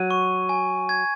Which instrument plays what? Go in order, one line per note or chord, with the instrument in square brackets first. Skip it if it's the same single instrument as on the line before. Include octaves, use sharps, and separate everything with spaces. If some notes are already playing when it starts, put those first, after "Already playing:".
Already playing: [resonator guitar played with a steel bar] F#3 [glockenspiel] D#7
[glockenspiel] C#6
G#5
G#6